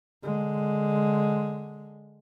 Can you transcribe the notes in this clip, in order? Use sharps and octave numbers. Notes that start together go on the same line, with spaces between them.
D3 G#3